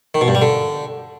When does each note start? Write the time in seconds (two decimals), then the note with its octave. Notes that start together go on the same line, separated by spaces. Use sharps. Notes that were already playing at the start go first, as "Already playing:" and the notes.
0.15 D#3
0.21 B2
0.28 G2
0.35 G3
0.42 D3